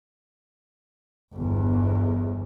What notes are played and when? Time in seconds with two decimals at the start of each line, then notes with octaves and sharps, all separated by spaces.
1.33 G1 E2